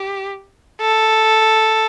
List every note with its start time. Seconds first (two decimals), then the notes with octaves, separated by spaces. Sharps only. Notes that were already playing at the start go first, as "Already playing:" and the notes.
Already playing: G4
0.81 A4